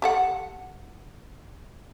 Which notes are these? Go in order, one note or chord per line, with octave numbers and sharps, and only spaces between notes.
G4 A4 F#5